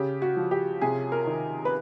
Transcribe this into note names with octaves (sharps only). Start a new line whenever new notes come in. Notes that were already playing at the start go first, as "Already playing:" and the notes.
Already playing: C#3 G4
F#4
F3
G4
C3 G#4
A#4
D#3
B4